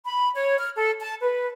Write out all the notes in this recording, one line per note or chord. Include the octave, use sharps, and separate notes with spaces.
B5
C#5
F6
A4
A5
B4